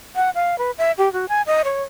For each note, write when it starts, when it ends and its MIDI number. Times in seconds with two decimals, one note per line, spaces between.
0.16 0.30 78
0.35 0.58 77
0.59 0.71 71
0.78 0.92 76
0.98 1.12 67
1.13 1.28 66
1.29 1.42 80
1.47 1.62 75
1.64 1.83 73